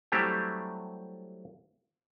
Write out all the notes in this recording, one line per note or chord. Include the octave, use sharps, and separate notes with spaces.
F#3 G3 A3 C4 E4 G4